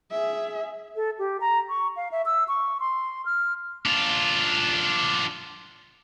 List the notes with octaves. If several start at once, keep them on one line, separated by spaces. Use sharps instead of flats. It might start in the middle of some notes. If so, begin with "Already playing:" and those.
G#4 E5
A4
G4
A#5
C#6
F5
E5
E6
C#6
C6
F6
D4 F4